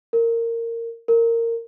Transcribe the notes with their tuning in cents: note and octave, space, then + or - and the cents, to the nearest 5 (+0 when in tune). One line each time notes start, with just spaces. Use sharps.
A#4 -15
A#4 -15